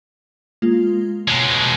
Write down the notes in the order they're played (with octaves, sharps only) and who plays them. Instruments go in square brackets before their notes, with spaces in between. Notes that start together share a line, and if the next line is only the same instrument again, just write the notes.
[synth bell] G#3 A#3 F4
[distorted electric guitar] B2 G#3 [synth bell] C#5 A#5